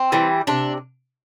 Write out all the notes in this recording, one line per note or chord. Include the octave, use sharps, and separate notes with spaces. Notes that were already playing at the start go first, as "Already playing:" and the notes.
Already playing: C4
E3 G3
C3 D4